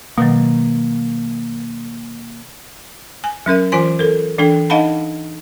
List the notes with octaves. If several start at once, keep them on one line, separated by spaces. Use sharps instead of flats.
B2 D#3 F#3 A#3
G#5
F#3 C#4 A#4 E5
E3 F4 C5 G#5 C6
A4 A#4
E3 D4 A4 G5
D#4 D#5 F5 F#5 A5 B5